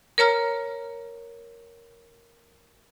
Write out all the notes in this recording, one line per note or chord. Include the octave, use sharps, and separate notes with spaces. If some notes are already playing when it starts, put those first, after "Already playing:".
A#4 C#5 A#5 F6